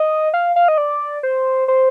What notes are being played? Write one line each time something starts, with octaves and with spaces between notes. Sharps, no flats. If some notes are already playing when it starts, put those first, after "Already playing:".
Already playing: D#5
F5
F5
D#5
D5
C5
C5